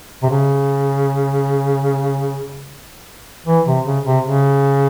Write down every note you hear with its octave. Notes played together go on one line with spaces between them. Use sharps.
C3
C#3
E3
C3
C#3
C3
C#3